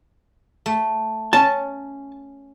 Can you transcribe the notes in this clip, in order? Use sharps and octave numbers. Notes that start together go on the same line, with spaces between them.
A3
C#4 A5